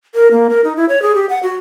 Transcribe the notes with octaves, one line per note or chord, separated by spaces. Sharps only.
A#4
A#3
A#4
D#4
E4
C#5
G#4
G4
F#5
F#4